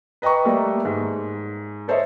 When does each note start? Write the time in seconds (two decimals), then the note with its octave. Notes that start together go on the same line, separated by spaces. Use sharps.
0.22 B4 D#5 G5 A#5 C#6
0.45 G3 A3 A#3
0.85 G#2
1.88 A4 C5 C#5 D#5 E5